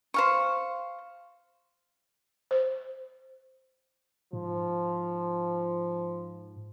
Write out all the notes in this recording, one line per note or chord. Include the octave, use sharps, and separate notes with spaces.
C5 F5 C#6
C5
G#2 F3